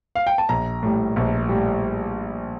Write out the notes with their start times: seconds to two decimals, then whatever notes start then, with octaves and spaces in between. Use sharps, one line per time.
0.15 F5
0.27 G5
0.38 A5
0.49 A#1 A#5
0.83 A2 G3
1.16 A#1
1.49 A2 G3